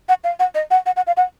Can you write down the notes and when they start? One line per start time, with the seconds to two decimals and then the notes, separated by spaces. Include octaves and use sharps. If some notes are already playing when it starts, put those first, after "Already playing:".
0.09 F#5
0.24 F5
0.39 F#5
0.55 D#5
0.71 F#5
0.86 F#5
0.96 F#5
1.07 F5
1.17 F#5